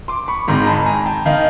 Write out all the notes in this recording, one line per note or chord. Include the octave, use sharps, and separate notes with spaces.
C6 D6
B5 C#6
G#1 G#2 D#3 A#5 C6
A#5
A5 B5
G#5 A#5
G5 A5
D#3 D#5 F5